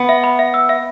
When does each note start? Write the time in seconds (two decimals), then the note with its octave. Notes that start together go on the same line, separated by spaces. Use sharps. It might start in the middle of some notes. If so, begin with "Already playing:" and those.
Already playing: B3
0.09 E5
0.24 B5
0.39 E5
0.54 E6
0.69 E5